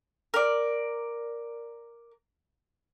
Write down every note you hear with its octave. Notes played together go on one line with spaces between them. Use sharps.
A#4 D5